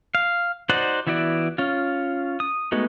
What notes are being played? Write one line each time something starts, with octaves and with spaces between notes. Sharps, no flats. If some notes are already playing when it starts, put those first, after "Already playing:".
F5
D#4 F#4 C5 D5 F#5
E3 B3 E4 F#4 D5
C#4 F4
D#6
G#3 A3 B3 D#4 F#4